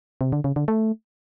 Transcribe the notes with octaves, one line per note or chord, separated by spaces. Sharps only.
C3
D3
C#3
D3
A3